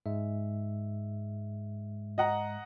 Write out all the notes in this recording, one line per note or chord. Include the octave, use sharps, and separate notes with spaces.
G#2 G#3 E5
D#5 F#5 A#5